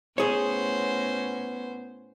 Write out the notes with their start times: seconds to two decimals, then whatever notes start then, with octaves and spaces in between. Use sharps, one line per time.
0.18 A2 B3 C#4 G#4 C5 C#5